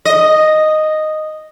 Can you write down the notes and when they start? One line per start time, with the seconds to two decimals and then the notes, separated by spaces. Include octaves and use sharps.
0.05 D#5